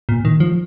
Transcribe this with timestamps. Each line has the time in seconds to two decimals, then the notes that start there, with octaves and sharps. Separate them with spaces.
0.09 A#2
0.25 D#3
0.40 F3